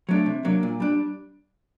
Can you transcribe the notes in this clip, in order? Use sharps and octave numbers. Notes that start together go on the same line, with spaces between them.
F#3 A3 D4
C3
F#3 A#3 D4
A#2
G3 D4